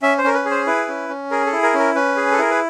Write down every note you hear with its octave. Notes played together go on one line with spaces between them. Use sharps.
C#4 E5
C5
C#4 A#4
B4
G#4
C5
E4 B4
C#4
C#4
G#4 A#4
A4
E4
A#4
C#4 A#4
C#4 B4
G#4
A4
E4 A#4
B4